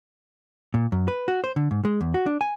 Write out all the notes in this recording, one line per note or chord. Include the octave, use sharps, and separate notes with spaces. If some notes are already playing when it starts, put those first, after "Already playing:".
A#2
F#2
B4
F#4
C5
D3
G#2
G#3
E2
F#4
D4
G#5